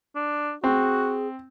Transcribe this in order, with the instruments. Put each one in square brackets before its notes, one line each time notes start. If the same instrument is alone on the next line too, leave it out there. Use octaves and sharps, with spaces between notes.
[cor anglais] D4
[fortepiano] C4 [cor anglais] F#4 [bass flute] G#4